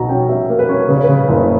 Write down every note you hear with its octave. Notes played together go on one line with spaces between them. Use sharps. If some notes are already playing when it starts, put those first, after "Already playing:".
Already playing: B1 B2 A#5
C#4 G5
B2 E5
A#3
B4
C#4
C#3 B4
C#5
B4
C#3
F#1